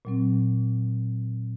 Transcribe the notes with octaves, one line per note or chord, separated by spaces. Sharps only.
A#2 F#3 C4